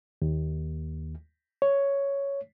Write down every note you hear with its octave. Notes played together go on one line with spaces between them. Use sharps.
D#2
C#5